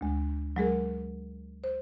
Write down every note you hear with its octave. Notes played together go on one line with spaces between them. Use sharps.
D2 G#3
F#3 G#3 G#4 A#4
C5